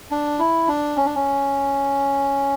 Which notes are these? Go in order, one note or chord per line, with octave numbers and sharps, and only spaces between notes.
D4
E4
D4
C#4
D4
C#4